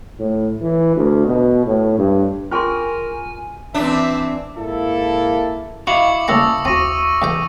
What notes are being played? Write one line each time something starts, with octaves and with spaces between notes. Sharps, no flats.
A2
E3
D2
B2
A2
G2
F4 G#4 A#4 G5 G#5 C6 C#6 F6
E3 C4 D4 E5
G#2 A#3 E4 A4
E4 F#4 D#5 F5 C#6 D6 C#7 F#7
C#3 G3 A#3 A5 C#6 D#6 E6 A#6
D#2 C4 F#4 C#6 A#6 D#7
B1 E2 G5